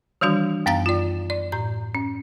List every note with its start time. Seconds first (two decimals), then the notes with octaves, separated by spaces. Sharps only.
0.21 D#3 E3 G3 D4 F#4
0.66 F#2 B3 F5 A#5 A6
0.86 F4 D5
1.30 D5
1.52 A2 G6
1.95 C#4